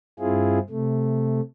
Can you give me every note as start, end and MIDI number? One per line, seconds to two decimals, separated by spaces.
0.19 0.59 43
0.19 0.59 60
0.19 0.59 64
0.19 0.59 65
0.19 0.59 68
0.70 1.41 48
0.70 1.41 57